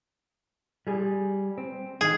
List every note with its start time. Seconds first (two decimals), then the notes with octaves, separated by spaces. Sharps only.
0.87 G3 G#4
1.58 C4
2.01 D#3 G#4